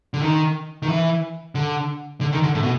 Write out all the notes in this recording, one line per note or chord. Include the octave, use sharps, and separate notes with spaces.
D3
D#3
D#3
E3
D3
D3
D#3
D3
A2
B2